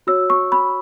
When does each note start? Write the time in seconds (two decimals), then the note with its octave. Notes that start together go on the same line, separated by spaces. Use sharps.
0.07 F#4 C#5 E6
0.30 C#6
0.52 B5